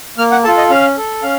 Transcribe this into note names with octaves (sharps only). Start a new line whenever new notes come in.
A#3 F6
F#5
F4 A4 A5
D#5
C#4 F5
A4
C#4 F5